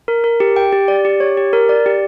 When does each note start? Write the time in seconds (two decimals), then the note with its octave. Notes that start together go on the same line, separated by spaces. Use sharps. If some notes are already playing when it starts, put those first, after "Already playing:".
0.08 A#4
0.24 A#4
0.40 G4
0.56 G5
0.72 G4
0.88 D5
1.05 G4
1.20 C#5
1.37 G4
1.53 A#4
1.69 D5
1.86 G4